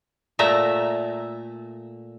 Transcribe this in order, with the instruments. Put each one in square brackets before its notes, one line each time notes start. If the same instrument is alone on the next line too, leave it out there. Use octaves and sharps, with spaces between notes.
[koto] A#2 A3 E5 A#5